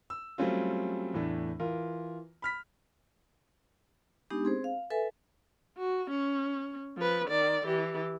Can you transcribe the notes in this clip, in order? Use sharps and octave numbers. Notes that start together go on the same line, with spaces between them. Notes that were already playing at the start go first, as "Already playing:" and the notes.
E6
F#3 G3 A3 C4 C#4 F4
E2 A2 A3 D4
E3 F4 A#4
B5 F6 B6
G#3 B3 D4 D#4 G4
C4 G#4 C5
F5
A4 B4 E5 G#5
F#4
C#4
F3 B4
D#3 D5
E3 G4